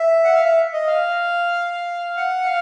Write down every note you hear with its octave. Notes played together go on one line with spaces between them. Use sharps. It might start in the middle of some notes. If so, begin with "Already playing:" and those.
Already playing: E5
F#5
F5
E5
D#5
F5
F#5
F5